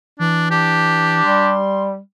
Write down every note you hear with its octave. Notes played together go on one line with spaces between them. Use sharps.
E3 D4
D4 G4
G3 C6